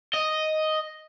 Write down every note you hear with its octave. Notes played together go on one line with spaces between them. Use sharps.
D#5